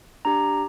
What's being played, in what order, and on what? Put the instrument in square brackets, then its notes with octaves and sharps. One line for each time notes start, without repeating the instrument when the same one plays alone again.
[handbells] D4 G4 A#5